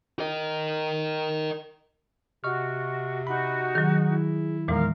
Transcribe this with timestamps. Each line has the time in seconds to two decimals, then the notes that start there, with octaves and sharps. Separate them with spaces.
0.20 A#4 D#5
2.44 C3 F#4 D#5 C#6 F6
3.27 D#4 F#4 B5
3.75 D#3 F#3 G#4
4.10 E4
4.68 E2 A#2 D#3 E3 G#3 A#4 F5